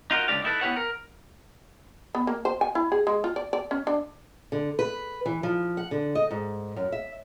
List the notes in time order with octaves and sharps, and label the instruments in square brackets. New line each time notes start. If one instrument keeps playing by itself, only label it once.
[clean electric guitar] D#4 F4 F#4 A#4
C#2 D3 A3 G4 D5 F5
D#4 E4 A4 B4
B3 E4 F4 G4 C#5 F#5
A#4
[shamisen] B3
A#3
C5
G#5
E4
G#4
G#3
F4
D5
D5
C#4
D4
[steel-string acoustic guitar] D3
B4
E3
F3
F#5
D3
D#5
G#2
F#2
E5